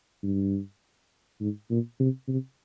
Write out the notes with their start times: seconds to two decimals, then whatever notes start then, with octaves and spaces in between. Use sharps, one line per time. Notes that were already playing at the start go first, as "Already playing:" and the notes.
0.23 G2
1.40 G#2
1.70 A#2
2.00 C3
2.28 C3